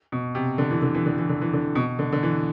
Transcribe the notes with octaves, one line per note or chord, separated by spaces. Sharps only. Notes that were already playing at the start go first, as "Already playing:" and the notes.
B2
C3
D3
E3
D3
E3
D3
E3
D3
E3
D3
B2
D3
D3
E3